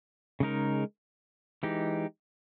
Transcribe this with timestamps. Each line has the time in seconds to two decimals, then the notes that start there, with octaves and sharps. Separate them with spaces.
0.40 C#3 G#3 D#4 A#4
1.63 E3 G#3 D#4 G4